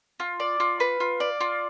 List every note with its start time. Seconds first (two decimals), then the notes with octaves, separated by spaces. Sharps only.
0.20 F4
0.40 D5
0.60 F4
0.80 B4
1.00 F4
1.20 D5
1.41 F4